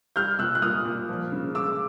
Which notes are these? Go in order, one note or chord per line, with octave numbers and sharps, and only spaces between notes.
G3 F6 G6
A#2 E6 F#6
F#6
A#2 D#6 F6
A#2
F3
C#3
G#3 D6 E6